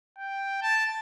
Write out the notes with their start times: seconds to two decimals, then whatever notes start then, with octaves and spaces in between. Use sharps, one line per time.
0.18 G5
0.62 A5